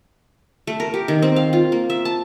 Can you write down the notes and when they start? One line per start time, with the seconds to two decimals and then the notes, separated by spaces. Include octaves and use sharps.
0.67 A3
0.80 A#4
0.94 G4
1.08 D#3
1.22 C4
1.36 F5
1.53 F4
1.72 A#3
1.90 E5
2.05 A5